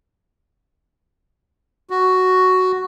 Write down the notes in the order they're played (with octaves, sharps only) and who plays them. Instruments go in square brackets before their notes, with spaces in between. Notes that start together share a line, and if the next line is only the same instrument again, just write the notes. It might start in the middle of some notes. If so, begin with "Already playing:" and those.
[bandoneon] F#4